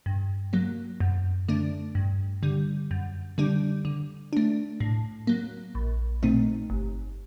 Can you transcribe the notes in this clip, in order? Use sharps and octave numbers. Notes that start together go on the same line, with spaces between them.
G2
F#3 A#3
F#2
D3 A3 D4
G2
D3 G3
F#2
D3 G3 D4
D3
A3 D4
A2
F#3 A#3
A#1
A#2 A3 C4 D#4
G1